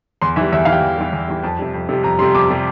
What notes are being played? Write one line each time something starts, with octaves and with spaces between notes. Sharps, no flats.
E2 C6
E3 G3 E5
E2 E5
E3 F5
G3 G5
E2
E3 G3
E2
E3 G3
F2 A5
C3 G3
F2
C3 G3
F2 A#5
C3 G3 C6
F2 D6
C3 G3